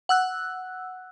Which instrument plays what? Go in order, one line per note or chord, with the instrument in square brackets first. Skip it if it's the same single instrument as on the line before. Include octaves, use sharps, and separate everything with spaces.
[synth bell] F#5 E6 F#6